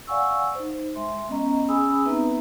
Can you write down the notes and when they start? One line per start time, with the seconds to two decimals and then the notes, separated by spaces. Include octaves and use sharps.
0.07 D5 F5 F#5 G#5 C#6 E6
0.55 D#4 C5
0.95 G#3 E5 C6
1.29 B3 C#4 D#5 A#5
1.69 C#4 G#4 G#5 B5 D#6 E6
2.05 B3 C4 D#4 B4 E5 A#5